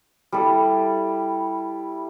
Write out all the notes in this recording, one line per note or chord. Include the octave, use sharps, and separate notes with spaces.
G3 E4 A4